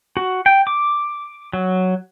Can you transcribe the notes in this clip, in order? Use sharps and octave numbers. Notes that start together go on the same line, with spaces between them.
F#4
G5
D6
F#3